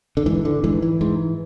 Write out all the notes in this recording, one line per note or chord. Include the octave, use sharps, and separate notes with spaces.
D3
G#2 E3
D3
G#2 E3
E3
G#2